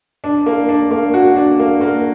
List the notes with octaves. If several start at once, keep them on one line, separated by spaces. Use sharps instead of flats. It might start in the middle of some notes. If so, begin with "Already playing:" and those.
D4
A#3
D4
A#3
F#4
D4
A#3
A#3